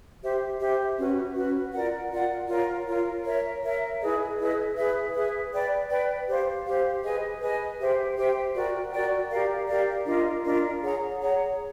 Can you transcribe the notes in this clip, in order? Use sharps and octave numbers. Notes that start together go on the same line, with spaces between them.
G4 C5 E5
G4 C5 E5
C#4 F#4 B4
C#4 F#4 B4
F4 A#4 D5 F#5
F4 A#4 D5 F#5
F4 A#4 C#5
F4 A#4 C#5
A#4 C#5 E5
A#4 C#5 E5
E4 G#4 B4 D#5
E4 G#4 B4 D#5
G#4 B4 E5
G#4 B4 E5
B4 D5 G5 B5
B4 D5 G5 B5
G4 C5 F5
G4 C5 F5
G#4 B4 D#5 G#5
G#4 B4 D#5 G#5
G4 C5 E5 G5
G4 C5 E5 G5
F#4 A#4 D5 G5
F#4 A#4 D5 G5
G4 A#4 D5 F5
G4 A#4 D5 F5
D4 F4 A#4 D#5
D4 F4 A#4 D#5
G#4 C#5 F#5 A#5
G#4 C#5 F#5 A#5